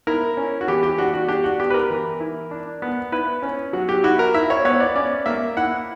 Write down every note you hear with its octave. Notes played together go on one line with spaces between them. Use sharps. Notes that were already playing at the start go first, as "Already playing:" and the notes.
E4 A#4
C#4
F#4
E3 G4
G4
D4 F#4
F#4
D4 G4
F#4
B3 G4
B4
A#4
E3
E4
D4
B3
E4 B4
C#4
F#3 F#4
G4
E4 F#4
A#4
E4 E5
C#5
B3 C#5
D5
C#4 D5
A#3 E5
E4 F#5